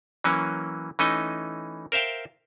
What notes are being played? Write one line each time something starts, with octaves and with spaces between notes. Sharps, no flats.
E3 F#3 A#3 C#4
E3 A3 C#4 D#4 D#5
A#4 C5 E5 F5 G5